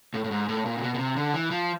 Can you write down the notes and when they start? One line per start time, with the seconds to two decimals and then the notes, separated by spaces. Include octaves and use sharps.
0.14 A2
0.24 A2
0.31 G#2
0.49 A2
0.66 A#2
0.77 C3
0.83 B2
0.94 B2
0.99 C3
1.16 D3
1.34 E3
1.51 F3